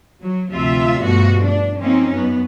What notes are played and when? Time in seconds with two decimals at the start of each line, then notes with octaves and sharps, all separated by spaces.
0.22 F#3
0.51 D2 C3 F3 F4 E5
0.99 G2 B2 F3 A3 F#4
1.47 D4
1.78 F3 A#3 C4 C#4 D#4
2.13 F#2 F#3 B3